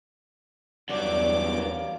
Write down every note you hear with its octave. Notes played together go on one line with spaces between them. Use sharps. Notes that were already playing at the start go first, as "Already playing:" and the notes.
E2 G2 F#3 D5 D6
F2 A#4 F5